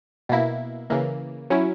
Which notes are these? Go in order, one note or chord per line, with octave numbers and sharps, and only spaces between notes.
B2 A#3 E4
C#3 E3 A#3
F#3 C#4 E4